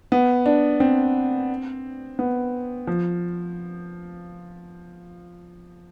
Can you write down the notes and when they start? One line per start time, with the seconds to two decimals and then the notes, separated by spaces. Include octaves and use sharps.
0.12 B3
0.46 D4
0.80 C4
2.19 B3
2.87 F3